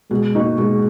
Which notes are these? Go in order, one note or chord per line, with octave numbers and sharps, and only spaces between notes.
B2 G#3
A#3 D#4 F#4
B2 G#3